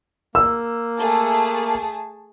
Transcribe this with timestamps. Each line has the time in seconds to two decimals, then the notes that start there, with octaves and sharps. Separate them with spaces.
0.35 A#3 E6
0.98 A3 G#4 A5